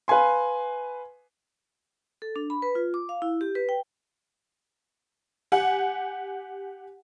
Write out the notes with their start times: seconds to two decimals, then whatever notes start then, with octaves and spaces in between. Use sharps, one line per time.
0.08 B4 F5 G#5 C6
2.22 A4
2.36 D4
2.50 B5
2.62 B4
2.75 F4
2.94 D6
3.09 F5
3.22 E4
3.41 G4
3.55 B4
3.69 G5
5.52 G4 F#5 G#5